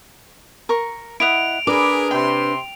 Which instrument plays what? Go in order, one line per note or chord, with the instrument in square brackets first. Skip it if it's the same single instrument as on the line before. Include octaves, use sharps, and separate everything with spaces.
[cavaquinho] A#4 C#6
[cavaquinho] E4 D#5 F#5 [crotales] D7 F7
[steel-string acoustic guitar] D4 B4 [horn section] G#4 A#4 [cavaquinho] D6
[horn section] C3 C6 [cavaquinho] G5